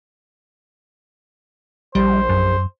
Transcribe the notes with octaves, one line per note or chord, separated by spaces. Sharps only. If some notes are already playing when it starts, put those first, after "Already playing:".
A#1 G3 C5
F#2